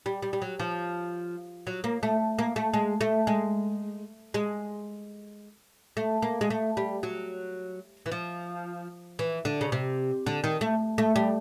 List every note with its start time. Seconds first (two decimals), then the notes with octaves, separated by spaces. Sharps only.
0.06 G3
0.23 G3
0.33 G3
0.42 F#3
0.60 F3
1.67 F#3
1.84 A#3
2.03 A3
2.39 A#3
2.56 A3
2.74 G#3
3.01 A3
3.27 G#3
4.34 G#3
5.97 A3
6.22 A#3
6.41 G#3
6.50 A3
6.77 G3
7.03 F#3
8.06 E3
8.12 F3
9.19 E3
9.45 D3
9.61 C#3
9.72 C3
10.26 D3
10.44 D#3
10.61 A3
10.98 A3
11.16 G3